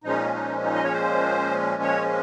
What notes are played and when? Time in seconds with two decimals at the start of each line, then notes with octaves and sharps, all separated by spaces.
0.04 A#2 F3 G#3 C#4 D#4
0.34 D#4
0.63 D#4
0.75 D#5
0.84 C#5
0.93 C5
1.82 C#5